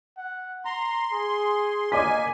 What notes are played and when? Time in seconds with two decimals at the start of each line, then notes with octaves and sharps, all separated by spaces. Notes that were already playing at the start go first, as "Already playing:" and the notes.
0.17 F#5
0.65 A#5 C6
1.12 G#4
1.92 A#3 D#5 G#5 D6 B6